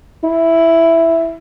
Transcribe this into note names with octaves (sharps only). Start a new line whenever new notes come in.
E4